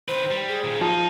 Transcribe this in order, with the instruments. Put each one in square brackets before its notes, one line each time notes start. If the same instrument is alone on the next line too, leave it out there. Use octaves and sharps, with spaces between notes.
[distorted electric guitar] D#3 B4 [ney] C5
[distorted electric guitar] G3
[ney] G#4
[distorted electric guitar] A#2 D#3
[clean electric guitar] F3 [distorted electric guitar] D#4